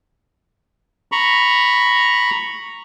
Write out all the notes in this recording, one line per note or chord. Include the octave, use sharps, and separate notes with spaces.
A#5 B5 C#6